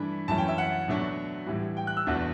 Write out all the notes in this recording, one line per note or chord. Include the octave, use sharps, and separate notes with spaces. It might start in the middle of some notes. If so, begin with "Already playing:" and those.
Already playing: G2 E3 A3 D4 B5
F#2 E3 A3 C#4 A5
G5
E5
F#5
B2 F#3 A3 D4
A2 E3 G3
G5
F#6
E6
E2 B2 A3 D4